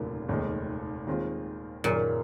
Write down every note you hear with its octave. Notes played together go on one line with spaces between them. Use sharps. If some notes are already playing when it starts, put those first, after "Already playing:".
Already playing: F1 D#2 A#2 C#3 F#3
F1 D#2 D#3 G#3 D#4
D#2 D#3 G#3 C4 F4
F#1 F#2 A#2 D#3